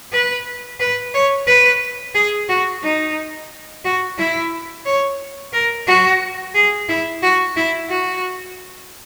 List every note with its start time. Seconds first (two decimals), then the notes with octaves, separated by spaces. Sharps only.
0.12 B4
0.80 B4
1.14 C#5
1.47 B4
2.14 G#4
2.48 F#4
2.83 D#4
3.84 F#4
4.18 E4
4.85 C#5
5.53 A#4
5.87 F#4
6.54 G#4
6.88 E4
7.22 F#4
7.56 E4
7.89 F#4